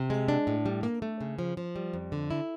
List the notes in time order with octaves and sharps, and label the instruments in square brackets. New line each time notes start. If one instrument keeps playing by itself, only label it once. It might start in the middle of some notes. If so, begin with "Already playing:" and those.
Already playing: [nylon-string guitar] C3
G#3
D4
A2
G3
A#3
A3
C#3
F3
F3
G3
F2
D3
E4